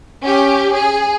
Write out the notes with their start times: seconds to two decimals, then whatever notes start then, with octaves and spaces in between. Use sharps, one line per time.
0.23 C#4 G4
0.73 G#4